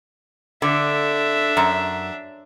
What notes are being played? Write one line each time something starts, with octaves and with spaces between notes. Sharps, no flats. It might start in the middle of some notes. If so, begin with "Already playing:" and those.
D3 D4 E5
F#2